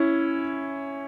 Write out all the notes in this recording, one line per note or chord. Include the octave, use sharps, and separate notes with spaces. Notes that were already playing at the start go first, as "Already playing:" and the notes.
Already playing: C#4 E4